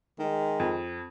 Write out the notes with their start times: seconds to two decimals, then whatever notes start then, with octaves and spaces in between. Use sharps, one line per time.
0.19 D#3 G#3
0.60 F2